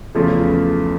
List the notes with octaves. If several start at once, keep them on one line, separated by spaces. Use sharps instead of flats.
E2 C#3 F3 A3